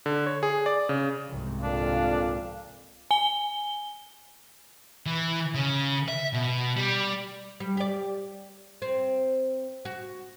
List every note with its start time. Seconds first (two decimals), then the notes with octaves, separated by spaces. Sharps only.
0.06 D3
0.26 C#5
0.43 G#4
0.66 D5
0.89 C#3
1.28 C2 G#2
1.63 F2 A#2 D4 F5
3.11 G#5 G7
5.06 E3
5.54 C#3
6.08 E5
6.33 B2
6.76 G3
7.60 G3
7.77 G4 D5
8.82 C4
9.85 F#4